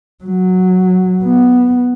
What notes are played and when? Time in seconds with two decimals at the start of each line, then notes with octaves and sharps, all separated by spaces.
0.24 F#3
1.24 B3